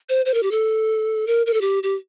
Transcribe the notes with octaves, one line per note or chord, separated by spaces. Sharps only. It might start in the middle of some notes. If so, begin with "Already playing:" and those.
C5
C5
A#4
G4
A4
A#4
A#4
A4
G4
G4